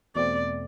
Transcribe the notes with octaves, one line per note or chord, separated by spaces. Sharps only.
E2 B2 A3 C4 D5